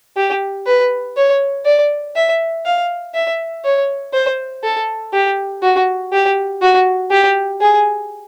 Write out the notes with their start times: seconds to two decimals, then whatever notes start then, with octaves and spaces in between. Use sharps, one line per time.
0.17 G4
0.67 B4
1.16 C#5
1.65 D5
2.16 E5
2.65 F5
3.14 E5
3.64 C#5
4.13 C5
4.63 A4
5.13 G4
5.63 F#4
6.12 G4
6.61 F#4
7.11 G4
7.61 G#4